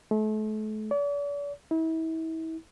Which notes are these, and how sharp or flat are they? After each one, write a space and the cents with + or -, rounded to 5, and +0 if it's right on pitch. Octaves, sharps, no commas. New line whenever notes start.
A3 -35
D5 -40
E4 -35